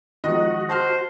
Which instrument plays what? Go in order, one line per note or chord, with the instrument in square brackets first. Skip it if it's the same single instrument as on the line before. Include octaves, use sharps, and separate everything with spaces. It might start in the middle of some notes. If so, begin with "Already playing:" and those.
[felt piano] D#3 F3 G#3 [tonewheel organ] F#4 [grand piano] D#5
[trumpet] C5 [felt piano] A5 C6 F6